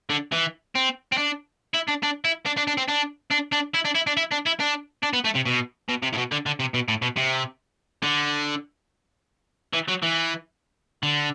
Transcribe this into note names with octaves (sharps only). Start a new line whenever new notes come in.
D3
E3
C4
C4
D4
E4
D4
D4
E4
D4
D4
D4
C4
D4
D4
D4
E4
D4
E4
D4
E4
D4
E4
D4
D4
B3
A3
C3
B2
B2
C3
A2
B2
D3
D3
C3
B2
A2
B2
C3
D3
E3
F#3
E3
D3